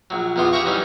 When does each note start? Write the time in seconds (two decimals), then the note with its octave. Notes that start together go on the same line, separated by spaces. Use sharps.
0.10 A#1 F#3
0.36 A#1 E2 B3 F4 C6 D6
0.53 G4 G#4 E5 F#5 A#5 C#6
0.65 E3 F#3 G3 C#4 D#4